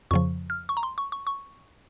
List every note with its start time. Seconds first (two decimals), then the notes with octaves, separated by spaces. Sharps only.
0.11 F2 C#3 F3 C#6
0.50 F6
0.69 C#6
0.77 A#5
0.83 C6
0.98 C#6
1.12 C#6
1.27 C#6